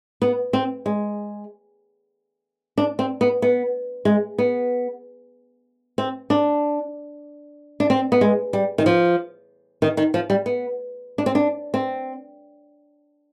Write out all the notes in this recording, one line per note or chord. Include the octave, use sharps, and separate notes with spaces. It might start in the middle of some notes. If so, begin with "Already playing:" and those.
B3
C4
G#3
D4
C4
B3
B3
G#3
B3
C4
D4
D4
C4
B3
G#3
G3
D#3
F3
D#3
D#3
F3
G3
B3
D4
C4
D4
C4